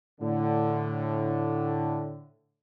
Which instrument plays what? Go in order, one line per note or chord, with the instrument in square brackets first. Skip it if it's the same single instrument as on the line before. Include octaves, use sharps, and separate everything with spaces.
[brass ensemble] A2 D3